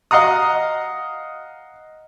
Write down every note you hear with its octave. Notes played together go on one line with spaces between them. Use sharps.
D#5 F5 F#5 A#5 D#6